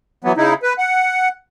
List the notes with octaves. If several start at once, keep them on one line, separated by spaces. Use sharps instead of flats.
E3 F#3 B3
C#3 D#4 E4
B4
F#5